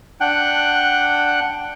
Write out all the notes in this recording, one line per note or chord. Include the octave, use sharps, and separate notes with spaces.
D4 F#5 G5 F#6